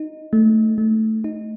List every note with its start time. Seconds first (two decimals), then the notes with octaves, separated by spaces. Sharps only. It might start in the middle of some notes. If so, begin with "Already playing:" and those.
Already playing: D#4
0.33 A3
0.78 A3
1.24 D#4